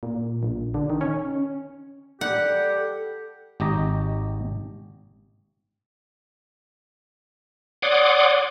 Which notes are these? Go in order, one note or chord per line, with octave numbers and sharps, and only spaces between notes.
A#2
A#1
D3
D#3
C#4
G3 G4 A4 F#5
G#1 G4 D#5 A#5
C#5 D5 F#5 C6 D6 D#6